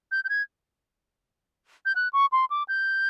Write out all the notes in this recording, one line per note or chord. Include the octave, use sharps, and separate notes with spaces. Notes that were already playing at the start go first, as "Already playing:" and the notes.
G6
G6
G#6
G6
F#6
C#6
C6
D6
G6